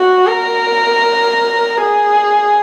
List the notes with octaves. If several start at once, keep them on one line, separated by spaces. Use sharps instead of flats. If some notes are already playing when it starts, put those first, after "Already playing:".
Already playing: F#4
A#4
G#4